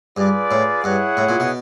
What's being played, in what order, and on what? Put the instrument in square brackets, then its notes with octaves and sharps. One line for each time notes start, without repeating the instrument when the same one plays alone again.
[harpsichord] G2 [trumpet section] F4 G#4 B4 D5
[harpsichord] A2
[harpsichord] G2 [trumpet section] E4 G#4 C#5 F#5
[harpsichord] A2
A#2
B2